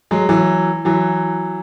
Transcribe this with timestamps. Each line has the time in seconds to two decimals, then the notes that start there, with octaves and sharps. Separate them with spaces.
0.11 F#3 G#3
0.29 E3 F#3
0.85 E3 F#3